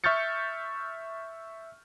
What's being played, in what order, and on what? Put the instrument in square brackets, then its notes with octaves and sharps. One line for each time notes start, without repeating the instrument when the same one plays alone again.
[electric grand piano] E5 C#6 F6 G6 A6 C#7